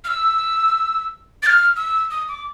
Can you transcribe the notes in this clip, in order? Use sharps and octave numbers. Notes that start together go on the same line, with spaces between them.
F6
E6
A6
F6
E6
D#6
D6